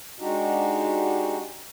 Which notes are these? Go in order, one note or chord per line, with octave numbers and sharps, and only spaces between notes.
G#3 D4 D#4 F#4 G4